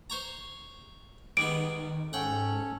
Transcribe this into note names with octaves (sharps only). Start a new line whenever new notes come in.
C5 C#5 A#5
D#3 G3 G#3 B3 D7
G#2 C#4 A4 C#5 F#5 G5